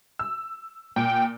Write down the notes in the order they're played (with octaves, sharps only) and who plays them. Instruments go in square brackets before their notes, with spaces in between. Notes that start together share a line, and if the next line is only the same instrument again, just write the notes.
[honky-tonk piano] E6
[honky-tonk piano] A#2 [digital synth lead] G5